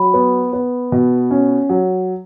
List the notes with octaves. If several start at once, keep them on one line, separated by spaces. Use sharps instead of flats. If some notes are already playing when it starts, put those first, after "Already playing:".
Already playing: F#3 B5
B3
B3
B2
C#4
F#3